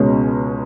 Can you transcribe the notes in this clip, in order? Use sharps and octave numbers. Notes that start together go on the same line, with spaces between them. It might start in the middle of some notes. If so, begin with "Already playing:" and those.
Already playing: C#2 B2 G#3 C#4